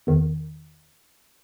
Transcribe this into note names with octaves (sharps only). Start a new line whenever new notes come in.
E2 D#3